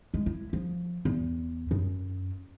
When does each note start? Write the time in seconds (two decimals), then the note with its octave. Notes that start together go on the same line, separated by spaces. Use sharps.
0.14 G#3
0.26 E4
0.53 F3
1.05 E2
1.71 F#2